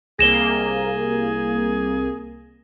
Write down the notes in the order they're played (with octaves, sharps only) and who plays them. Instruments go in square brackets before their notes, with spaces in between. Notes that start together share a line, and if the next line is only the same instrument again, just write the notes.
[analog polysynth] C2 A#3 [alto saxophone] G#4 [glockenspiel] A#6 E7 G7